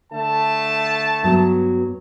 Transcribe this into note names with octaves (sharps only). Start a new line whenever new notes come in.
D3 A3 A5
G2 F#3 B3